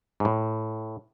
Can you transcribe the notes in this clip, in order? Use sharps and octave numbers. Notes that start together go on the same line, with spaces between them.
G#2
A2